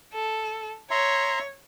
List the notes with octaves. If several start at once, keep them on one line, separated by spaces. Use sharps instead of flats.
A4
C#5 E5 A#5 C6